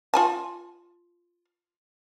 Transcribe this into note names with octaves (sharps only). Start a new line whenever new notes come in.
F4 G#5 A5